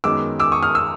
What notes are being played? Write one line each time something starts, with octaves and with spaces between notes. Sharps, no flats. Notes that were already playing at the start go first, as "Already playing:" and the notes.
F#2 D#3 G#3 B3 D6 E6
D6 E6
C#6 D#6
D#6 F6
E6